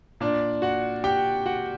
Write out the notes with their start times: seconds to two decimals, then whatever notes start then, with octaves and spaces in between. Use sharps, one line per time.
0.20 A#2 D4 D5
0.62 F#4 F#5
1.04 G4 G5
1.46 F#4 F#5